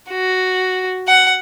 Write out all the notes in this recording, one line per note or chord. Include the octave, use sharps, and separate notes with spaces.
F#4
F#5